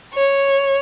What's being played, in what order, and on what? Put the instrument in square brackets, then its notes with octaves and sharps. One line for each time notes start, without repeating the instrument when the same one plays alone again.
[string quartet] C#5